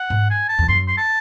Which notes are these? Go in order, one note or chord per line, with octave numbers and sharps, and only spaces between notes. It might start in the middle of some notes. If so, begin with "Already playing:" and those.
Already playing: F#5
G#2
G#5
A5
E2
F#2 C6
C6
A5